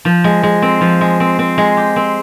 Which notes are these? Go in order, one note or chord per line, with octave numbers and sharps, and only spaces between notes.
F3
G#3
G#3
C4
F3
G#3
C4
C4
G#3
G4
C4